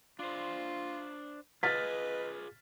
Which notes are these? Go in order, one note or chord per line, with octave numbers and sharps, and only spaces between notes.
D4 F4 C5
F4 G#4 B4 D#5 F6 A6 B6